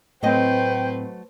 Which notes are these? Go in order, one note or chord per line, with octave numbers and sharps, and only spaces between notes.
A2 F#3 A3 C4 B4 C5 D#5 G5